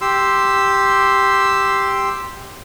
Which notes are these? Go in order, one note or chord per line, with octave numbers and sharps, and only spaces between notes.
G4 C6 E6